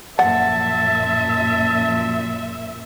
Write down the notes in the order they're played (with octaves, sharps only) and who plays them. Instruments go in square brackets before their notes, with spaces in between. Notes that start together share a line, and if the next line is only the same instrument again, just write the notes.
[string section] F#2 A#2 F3 [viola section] E5 [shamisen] F#5 [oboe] A5